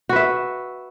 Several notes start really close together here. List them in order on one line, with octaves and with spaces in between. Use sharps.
F#4 B4 E5